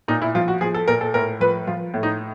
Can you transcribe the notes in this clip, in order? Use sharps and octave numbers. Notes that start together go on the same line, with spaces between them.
A#2 D#4
E4
F3 F4
F#4
F3 G#4
A4
A#2 A#4
A4
A2 A#4
F3 B4
F3 F4
A2
D#4